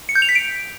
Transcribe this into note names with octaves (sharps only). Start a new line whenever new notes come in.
C#7
G6
F7
B6
D7